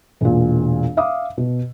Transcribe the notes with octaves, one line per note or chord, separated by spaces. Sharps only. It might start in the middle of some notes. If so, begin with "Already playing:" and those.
E1 A#2
E5 F5 D6 D#6
B2